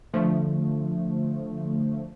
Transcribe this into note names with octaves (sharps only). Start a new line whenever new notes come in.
D3 F3 A3